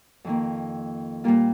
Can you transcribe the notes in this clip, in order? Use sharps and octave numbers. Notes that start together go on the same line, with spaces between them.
F2 D#3 A#3
A#2 G3 A#3 F4